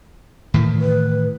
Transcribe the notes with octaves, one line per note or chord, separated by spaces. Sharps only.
A2 D#3 E3
B4